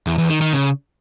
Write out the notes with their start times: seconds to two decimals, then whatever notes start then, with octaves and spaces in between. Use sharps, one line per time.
0.07 E2
0.18 E2
0.30 D#3
0.41 D#3
0.53 C#3